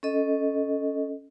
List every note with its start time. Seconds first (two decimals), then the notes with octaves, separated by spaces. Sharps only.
0.03 C#4 A4 D#5